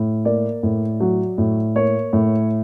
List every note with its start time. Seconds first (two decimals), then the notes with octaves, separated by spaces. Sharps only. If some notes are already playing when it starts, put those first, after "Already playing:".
Already playing: A2
0.25 A#3 D5
0.63 A2
1.00 F#3
1.38 A2
1.76 A#3 C#5
2.13 A2